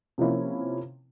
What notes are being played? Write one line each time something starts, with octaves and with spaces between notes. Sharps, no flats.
C3 F3 A#3 C#4 E4